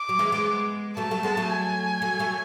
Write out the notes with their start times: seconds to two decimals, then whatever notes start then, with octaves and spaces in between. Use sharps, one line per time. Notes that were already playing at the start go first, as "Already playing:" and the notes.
Already playing: D6
0.09 F#3
0.19 E3 G#3
0.32 G#3 B3
0.97 F#3 A3 A5
1.11 F#3 A3
1.23 G#3 B3
1.37 F#3 A3
1.50 G#5
2.02 F#3 A3
2.19 F#3 A3